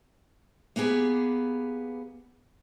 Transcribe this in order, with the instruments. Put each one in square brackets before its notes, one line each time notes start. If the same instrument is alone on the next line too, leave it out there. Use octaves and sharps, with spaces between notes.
[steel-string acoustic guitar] A#3 B3 G4 G#4 B4